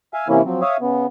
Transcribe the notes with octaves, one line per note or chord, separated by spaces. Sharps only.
E5 F5 G#5
C3 E3 A#3 C#4 E4
F3 F#3 C4
C#5 E5 F5 D#6
C#3 B3